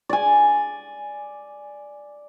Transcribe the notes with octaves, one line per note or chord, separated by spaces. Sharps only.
D5 G#5